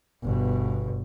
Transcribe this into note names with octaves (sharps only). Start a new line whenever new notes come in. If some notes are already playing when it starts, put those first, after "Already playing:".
G1 B2